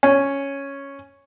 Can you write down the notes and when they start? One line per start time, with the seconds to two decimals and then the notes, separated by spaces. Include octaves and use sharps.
0.03 C#4